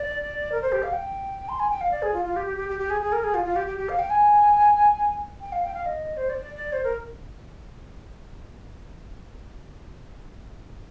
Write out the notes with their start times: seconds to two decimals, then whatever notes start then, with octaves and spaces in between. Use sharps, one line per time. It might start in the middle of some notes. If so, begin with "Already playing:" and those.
Already playing: D5
0.52 A#4
0.61 C5
0.72 G4
0.82 F5
0.93 G5
1.49 C6
1.59 G#5
1.69 G5
1.81 F5
1.91 D5
2.02 G#4
2.13 F4
2.24 F4
2.36 G4
2.46 G4
2.57 G4
2.68 G4
2.79 G4
2.90 G#4
3.01 G#4
3.12 A#4
3.23 G#4
3.34 F4
3.44 F4
3.56 G4
3.67 G4
3.77 G4
3.89 F5
3.99 G5
4.10 G#5
5.41 G5
5.52 F5
5.64 G5
5.74 F5
5.85 D#5
6.17 C5
6.29 D5
6.72 C5
6.83 A#4